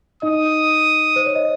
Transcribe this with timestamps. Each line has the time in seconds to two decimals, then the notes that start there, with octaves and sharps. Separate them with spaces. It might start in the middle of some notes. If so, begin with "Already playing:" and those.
0.22 D#4 D#5 D#6
1.16 C5
1.26 C#5
1.35 D#5